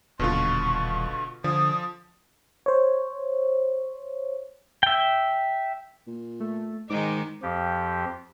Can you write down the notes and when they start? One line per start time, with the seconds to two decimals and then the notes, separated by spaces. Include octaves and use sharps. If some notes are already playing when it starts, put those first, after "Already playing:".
0.20 D#1 B2 D3 F4 C#6
1.44 D3 F3 D#6
2.66 C5 C#5
4.83 E5 G5
6.07 A#2
6.40 A3
6.90 G#2 D#3 G#3 D#4 D6
7.43 F2 F3 G4